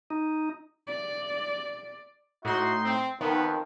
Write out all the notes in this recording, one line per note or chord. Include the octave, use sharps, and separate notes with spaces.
D#4
D5
A2 D#4 F#4 C6
C4
F2 D#3 B3